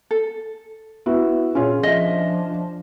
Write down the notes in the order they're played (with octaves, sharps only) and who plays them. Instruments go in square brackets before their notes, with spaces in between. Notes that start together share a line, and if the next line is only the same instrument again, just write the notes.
[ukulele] A4
[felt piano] B3 E4 F#4
[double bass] A#2 [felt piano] C#4 F4 G#4
[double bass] F3 D4 [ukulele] D#5 E5